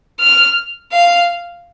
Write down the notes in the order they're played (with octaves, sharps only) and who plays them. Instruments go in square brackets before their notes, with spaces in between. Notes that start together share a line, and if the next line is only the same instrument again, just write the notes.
[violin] F6
F5